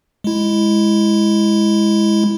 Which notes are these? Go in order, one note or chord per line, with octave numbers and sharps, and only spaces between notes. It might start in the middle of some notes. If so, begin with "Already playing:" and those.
G#3 E4